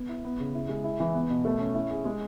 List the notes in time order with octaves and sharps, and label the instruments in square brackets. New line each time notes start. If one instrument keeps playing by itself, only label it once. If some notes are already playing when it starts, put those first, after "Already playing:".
Already playing: [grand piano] B3
E4
B3
C#3
E4
G#3
E4
E3
B3
B2
A3
C#4
E4
G#4
G#3